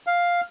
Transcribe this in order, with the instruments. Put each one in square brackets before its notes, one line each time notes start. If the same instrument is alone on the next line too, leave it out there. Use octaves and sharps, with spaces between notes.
[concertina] F5